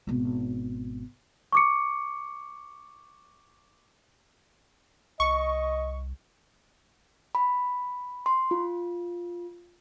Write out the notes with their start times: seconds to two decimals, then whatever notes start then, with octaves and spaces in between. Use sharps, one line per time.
0.07 G#1 B2
1.52 C#6 D6 C#7
5.20 C2 D#5 C#6
7.35 B5
8.26 C6
8.51 F4